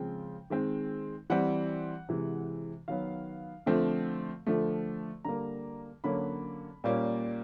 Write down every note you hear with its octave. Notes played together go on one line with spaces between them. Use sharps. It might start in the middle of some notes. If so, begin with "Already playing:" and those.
Already playing: C#3 F3 G#3 C4 G5
D#3 G#3 C4
E3 G3 C4 F#5
C3 E3 G#3
D#3 F#3 B3 F5
D3 F3 A3 C4
D3 F3 A3
D3 G3 A#3 A#5
D3 F#3 A#3 C#4 B5
A#2 G3 A#3 C#4